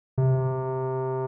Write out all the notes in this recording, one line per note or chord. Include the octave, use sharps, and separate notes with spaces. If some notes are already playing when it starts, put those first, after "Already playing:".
C3